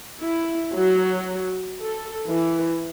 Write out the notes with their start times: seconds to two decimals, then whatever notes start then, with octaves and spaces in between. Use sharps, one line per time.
0.19 E4
0.73 F#3
1.80 A4
2.26 E3